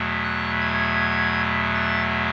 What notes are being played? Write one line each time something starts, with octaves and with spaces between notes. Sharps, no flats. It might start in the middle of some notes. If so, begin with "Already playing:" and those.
Already playing: E2 B2 F#3 A3
F#6
G#6
A6